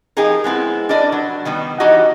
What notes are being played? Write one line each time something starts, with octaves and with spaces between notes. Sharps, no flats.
F3 D#4 G4 G#4 A#4
G#3 B3 C4 E4
D4 A#4 B4 D5 D#5
F#3
D#3 G3 B3
E3 D4 D#4 F#4 G4 D#5